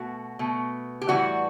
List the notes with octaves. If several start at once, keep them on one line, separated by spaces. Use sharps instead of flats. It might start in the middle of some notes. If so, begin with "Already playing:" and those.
Already playing: B2 A3 F#4
B2 A3
G4
A2 E3 G3 F#4